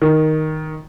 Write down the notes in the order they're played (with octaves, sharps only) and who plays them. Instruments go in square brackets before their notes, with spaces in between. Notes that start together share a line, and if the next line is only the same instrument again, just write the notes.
[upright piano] D#3